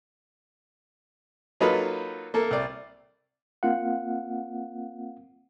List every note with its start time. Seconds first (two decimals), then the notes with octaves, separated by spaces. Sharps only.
1.60 F#3 A#3 D#4 F4 A4 B4
2.34 A#3 A4
2.51 C2 D5
3.63 A#3 C4 F4 F5 F#5